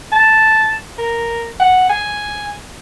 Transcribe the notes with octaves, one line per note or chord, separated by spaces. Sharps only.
A5
A#4
F#5
G#5